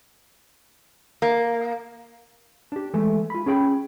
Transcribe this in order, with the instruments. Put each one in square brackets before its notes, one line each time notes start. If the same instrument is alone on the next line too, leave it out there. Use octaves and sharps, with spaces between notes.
[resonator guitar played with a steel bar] A#3
[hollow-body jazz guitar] D4 G4
E3 G#3 A3
F4 B5
C#4 G#4 G5 B5